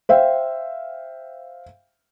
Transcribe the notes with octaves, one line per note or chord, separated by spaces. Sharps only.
C5 E5 F5 G5